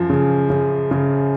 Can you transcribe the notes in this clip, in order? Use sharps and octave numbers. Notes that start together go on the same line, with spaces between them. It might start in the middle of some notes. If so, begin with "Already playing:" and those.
Already playing: F#2 F3
C#3
C#3
C#3